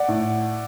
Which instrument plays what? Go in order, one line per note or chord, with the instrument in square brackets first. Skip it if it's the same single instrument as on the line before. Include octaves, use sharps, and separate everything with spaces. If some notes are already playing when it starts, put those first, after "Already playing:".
Already playing: [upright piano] D5 F#5
A2